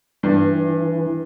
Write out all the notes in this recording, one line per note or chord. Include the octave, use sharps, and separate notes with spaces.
G2 E3